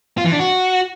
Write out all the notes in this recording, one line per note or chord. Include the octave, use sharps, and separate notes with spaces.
F4
E3
D4
F#4